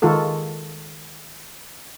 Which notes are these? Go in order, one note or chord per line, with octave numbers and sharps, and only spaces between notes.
D#3 G#3 F4 F#4 A4